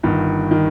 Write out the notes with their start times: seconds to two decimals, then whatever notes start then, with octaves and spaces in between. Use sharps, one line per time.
0.03 G1 G2 D#3
0.51 D#3